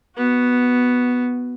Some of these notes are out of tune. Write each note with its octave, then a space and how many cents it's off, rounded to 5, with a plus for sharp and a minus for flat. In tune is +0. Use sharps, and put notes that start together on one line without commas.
B3 +0 F#4 +0